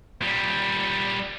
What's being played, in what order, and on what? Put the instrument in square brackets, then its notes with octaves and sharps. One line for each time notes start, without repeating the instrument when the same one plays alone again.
[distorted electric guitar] A#2 G3